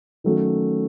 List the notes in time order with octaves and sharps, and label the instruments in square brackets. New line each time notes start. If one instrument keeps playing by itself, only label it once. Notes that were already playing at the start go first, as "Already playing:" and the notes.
[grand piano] D#3 F#3 A3 C#4 F#4